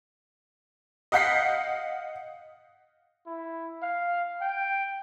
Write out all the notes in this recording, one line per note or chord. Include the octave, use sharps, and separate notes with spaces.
D#5 F5 F#5 G6 B6 C7
E4
F5
G5